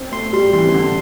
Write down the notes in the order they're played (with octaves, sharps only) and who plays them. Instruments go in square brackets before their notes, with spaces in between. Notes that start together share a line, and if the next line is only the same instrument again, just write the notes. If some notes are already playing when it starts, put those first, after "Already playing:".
Already playing: [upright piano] C4
[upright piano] A3 [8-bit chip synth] C6
[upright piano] G3 [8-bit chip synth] C6
[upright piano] E3 [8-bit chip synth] C6
[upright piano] C3
D3